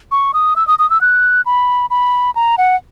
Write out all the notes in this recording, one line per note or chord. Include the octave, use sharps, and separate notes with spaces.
C#6
D#6
E6
D#6
D#6
E6
F#6
B5
B5
A#5
F#5